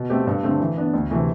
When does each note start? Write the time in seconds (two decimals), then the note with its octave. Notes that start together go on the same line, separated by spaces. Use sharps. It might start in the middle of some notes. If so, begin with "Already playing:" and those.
Already playing: B2
0.10 A3 C4 G4
0.27 G2
0.43 D3 A3 C4
0.59 E3
0.77 B3 D4
0.94 D2
1.11 C3 E3 A3